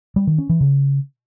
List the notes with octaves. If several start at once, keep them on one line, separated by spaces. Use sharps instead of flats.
G3
D#3
C#4
E3
C#3